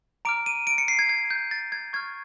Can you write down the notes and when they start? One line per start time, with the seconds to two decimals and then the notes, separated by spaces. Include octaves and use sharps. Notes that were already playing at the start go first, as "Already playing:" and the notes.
0.25 A#5 D6 F6 D7
0.46 D#7
0.67 D7
0.78 C#7
0.88 C7
0.99 G#6
1.09 G#6
1.31 G6
1.51 A6
1.72 G#6
1.93 C#6 F6 G#6